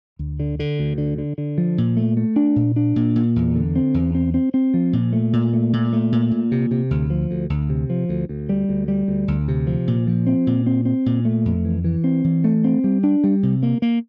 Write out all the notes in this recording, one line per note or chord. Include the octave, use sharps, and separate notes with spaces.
D2
D3
D3
D2
D3
D3
D3
F3
A#2
A3
A3
D4
A#2
D4
A#2
A#2
E2
D3
C4
E2
C4
C4
C4
F3
A#2
A3
A#2
A3
A#2
A3
A#2
A#2
C3
C3
D2
F3
D2
D2
C3
F3
D2
D2
G3
D2
G3
D2
D2
C3
F3
A#2
F3
C4
A#2
C4
C4
A#2
A3
F2
E3
E3
C4
E3
A3
C4
G3
D4
G3
C3
A#3
A#3